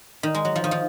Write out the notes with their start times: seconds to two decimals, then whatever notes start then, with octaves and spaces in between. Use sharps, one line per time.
0.23 D#3
0.35 G#3
0.45 F#3
0.56 F3
0.64 D#3
0.71 F3